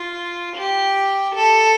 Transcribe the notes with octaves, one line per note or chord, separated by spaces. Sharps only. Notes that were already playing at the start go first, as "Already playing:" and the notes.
Already playing: F4
G4
A4